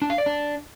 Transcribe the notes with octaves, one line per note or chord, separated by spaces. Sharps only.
D4
F5
D5
D4